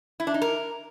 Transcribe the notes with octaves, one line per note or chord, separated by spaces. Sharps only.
E4
D4
D#4
A#4